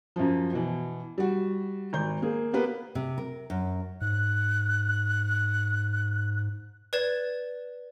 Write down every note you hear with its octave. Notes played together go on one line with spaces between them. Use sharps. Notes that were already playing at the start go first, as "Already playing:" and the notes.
F#2 F3
B2 E3
G3 F#4
G#1 G6
A#3 G#4
A#3 B3 G4 B4
C3
A#4
F#2
G#2 F#6
B4 D5 G#6 E7